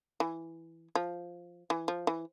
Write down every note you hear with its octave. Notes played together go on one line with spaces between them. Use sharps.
E3
F3
E3
F3
E3